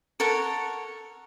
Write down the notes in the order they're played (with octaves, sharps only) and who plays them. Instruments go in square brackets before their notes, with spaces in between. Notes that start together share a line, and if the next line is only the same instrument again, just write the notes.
[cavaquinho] A4 A#4 C#5 F#5